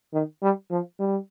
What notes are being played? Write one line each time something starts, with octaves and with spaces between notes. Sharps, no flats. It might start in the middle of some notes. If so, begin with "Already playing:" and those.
D#3
G3
F3
G3